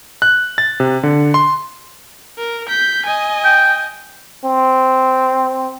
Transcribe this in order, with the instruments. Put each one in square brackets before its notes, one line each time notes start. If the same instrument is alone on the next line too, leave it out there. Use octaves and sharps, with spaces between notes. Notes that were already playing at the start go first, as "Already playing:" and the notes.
[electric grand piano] F#6
A6
C3
D3
C6
[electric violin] A#4
G6 B6
D#5 G#5
[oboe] G5
[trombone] C4